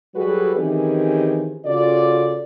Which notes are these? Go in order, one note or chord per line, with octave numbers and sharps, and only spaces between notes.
F#3 G3 F#4 G#4 A4 B4
D#3 E3 C4 C#4 G4 G#4
C#3 F4 F#4 A4 D5